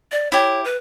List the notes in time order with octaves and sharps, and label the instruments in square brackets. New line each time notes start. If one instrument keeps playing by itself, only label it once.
[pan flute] D5
[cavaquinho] E4 G4 [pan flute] C#5
[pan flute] B4